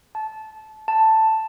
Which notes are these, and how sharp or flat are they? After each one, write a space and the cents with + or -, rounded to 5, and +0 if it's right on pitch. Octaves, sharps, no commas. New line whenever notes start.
A5 -15
A5 +5